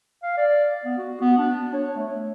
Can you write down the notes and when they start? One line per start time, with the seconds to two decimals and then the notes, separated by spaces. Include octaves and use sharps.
0.23 F5
0.37 D5
0.85 B3
0.98 F#4
1.21 B3
1.38 D4
1.74 C#5
1.96 A3